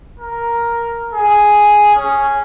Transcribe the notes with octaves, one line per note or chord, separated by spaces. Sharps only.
A#4
G#4
C#4